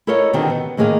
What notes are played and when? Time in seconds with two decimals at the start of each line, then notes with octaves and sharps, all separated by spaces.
0.07 E4 A4 A#4 C#5 D#5 F5
0.33 B2 D3 D#3 C4 D4 G4
0.50 B3
0.77 A2 D#3 A#3 G#4 C#5 F5